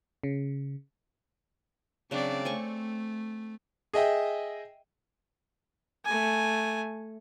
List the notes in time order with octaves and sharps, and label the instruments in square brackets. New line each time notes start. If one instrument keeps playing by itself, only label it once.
[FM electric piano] C#3
[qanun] C#3 D4 [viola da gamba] F#3 C4 D5
[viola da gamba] A3 [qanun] C4 G#5 C#6
[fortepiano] G#4 D#5 E5 G5
[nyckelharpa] A3 G#5